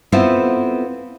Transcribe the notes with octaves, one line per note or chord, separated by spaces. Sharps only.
B3 C4 E4 F4 A4 B4